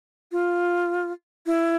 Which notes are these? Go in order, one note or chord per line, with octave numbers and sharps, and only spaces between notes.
F4
E4